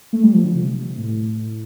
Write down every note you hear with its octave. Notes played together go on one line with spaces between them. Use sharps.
A3
G3
F3
D3
C3
A2